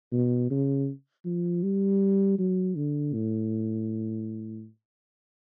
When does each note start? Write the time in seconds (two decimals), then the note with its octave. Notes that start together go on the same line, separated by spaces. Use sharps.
0.13 B2
0.51 C#3
1.25 F3
1.63 G3
2.39 F#3
2.76 D3
3.14 A2